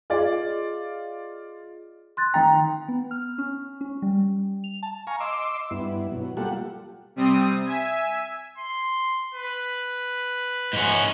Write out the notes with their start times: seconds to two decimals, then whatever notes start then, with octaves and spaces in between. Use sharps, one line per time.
0.10 F4 G#4 D5 D#5
2.17 C6 F#6 A6
2.34 D#3 G5 A#5
2.88 B3
3.11 F6
3.38 C#4
3.81 C#4
4.02 G3
4.64 F7
4.83 A5
5.07 F5 G#5 A#5 C#6
5.20 D#5 C6 D6 E6
5.71 G2 B3 E4
6.12 B2 F#3
6.37 G3 A#3 F4 G4 A4 F#5
7.16 C3 G3 C4 D#6
7.66 E5 G#5
8.58 C6
9.34 B4
10.73 G#2 C#4